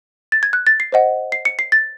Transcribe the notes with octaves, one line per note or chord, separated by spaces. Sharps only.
A6
G#6
F#6
A6
C7
C5 D#5 F#5
C7
C#7
C7
A6